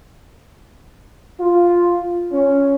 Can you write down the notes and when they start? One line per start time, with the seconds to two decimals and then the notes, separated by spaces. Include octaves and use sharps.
1.40 F4
2.33 C#4